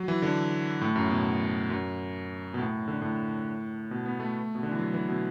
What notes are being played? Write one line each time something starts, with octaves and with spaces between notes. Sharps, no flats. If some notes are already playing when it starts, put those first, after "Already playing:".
Already playing: F#3
E3
D3
A2
F#2
B2
F#2
B2
A2
D3
A2
B2
B3
A3
B2
D3
E3
F#3
E3
B2